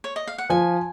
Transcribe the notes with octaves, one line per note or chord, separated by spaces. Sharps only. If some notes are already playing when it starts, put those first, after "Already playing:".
C#5
D#5
F5
F#5
F3 G#5